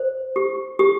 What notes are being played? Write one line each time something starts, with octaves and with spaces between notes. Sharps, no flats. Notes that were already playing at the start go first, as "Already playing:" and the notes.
Already playing: C5
G4
G4